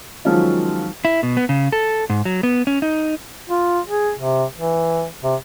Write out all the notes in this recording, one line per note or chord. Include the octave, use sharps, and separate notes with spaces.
D#3 F3 F#3 G#3 C#4 F4
E4
B2
B3
C#3
A4
G#2
F#3
B3
C#4
D#4
F4
G#4
C3
E3
C3